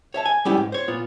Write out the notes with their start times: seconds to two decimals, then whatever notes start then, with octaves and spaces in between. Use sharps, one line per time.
0.14 C#5 E5 A5
0.26 G#5
0.45 G3 B3 C#4 E4 G4
0.57 G#2
0.72 C5 C#5
0.88 A#2 B3 F4